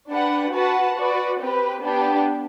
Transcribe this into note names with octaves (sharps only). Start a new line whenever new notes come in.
D4 G4 B4 F#5
F#4 B4 F#5 A5
F#4 B4 D5
C4 G4 B4
B3 D4 G4